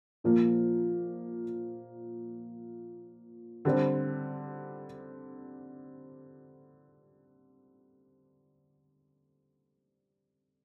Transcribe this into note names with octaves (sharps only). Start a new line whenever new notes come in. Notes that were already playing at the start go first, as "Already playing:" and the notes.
A#2 F3 A#3
D3 G3 C4